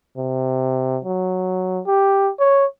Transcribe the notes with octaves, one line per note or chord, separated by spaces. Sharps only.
C3
F#3
G4
C#5